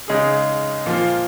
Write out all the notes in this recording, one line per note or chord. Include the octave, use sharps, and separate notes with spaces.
C#3 G#3 D#4 G#4
A#2 F3 A#3 F4